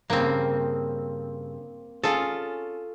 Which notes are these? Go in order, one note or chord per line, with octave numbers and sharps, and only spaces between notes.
G2 C#3 A#3 C4
C#4 F4 G#4 A4